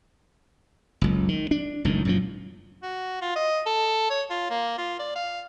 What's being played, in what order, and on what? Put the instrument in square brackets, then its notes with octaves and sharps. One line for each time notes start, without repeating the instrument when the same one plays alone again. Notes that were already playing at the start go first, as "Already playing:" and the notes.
[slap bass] F#1 C#2
D#3
D4
F#1 C#2 A2 D#3
F#2 A#2 F3
[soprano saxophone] F#4
F4
D#5
A4
C#5
F4
A#3
F4
D5
F5